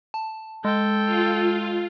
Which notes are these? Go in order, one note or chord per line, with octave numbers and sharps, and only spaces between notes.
A5
G#3 A4 G5
F4